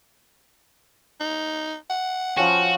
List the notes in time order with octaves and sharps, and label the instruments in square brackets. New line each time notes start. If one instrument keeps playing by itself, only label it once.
[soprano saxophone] D#4
F#5
[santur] F3 C#4 G5 [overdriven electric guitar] F#4